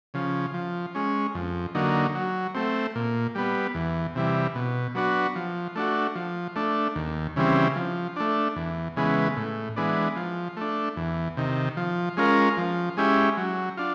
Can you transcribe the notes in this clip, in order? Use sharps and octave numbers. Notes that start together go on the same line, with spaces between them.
C#3 F3
F3
G#3 C#4
F2
D3 F#3 A#3 D#4
F#3
A3 C4
A#2
G3 B3
E2
C3 E3 G3
B2
F#3 B3 D4 F#4
F3
A3 D4 F#4
F3
A3 D4
D#2
C#3 E3 G3 C4
F3
A3 D4
E2
C#3 E3 G#3 B3
A2
E3 G#3 B3 D4
F3
A3 D4
E2
C3 D#3
F3
G#3 C#4 F4 A#4
F3
G#3 C#4 E4 G4
F#3
D4 F4